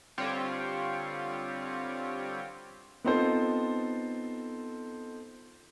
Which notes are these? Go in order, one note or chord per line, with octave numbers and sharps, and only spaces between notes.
D3 G3 C4 F4 G4 C#5
B3 C4 D#4 F4 A4 C5